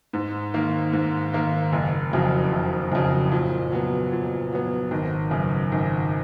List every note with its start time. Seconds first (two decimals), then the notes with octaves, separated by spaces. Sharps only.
0.13 G#2
0.54 D#3 A#3
0.93 G#2
1.33 D#3 A#3
1.73 F#1
2.13 F2 C#3 F#3
2.52 F#1
2.92 F2 C#3 F#3
3.32 A#2
3.72 F#3 B3
4.12 A#2
4.52 F#3 B3
4.91 G#1
5.31 F#2 C#3
5.72 G#1